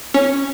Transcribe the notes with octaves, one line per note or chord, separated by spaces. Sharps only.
C#4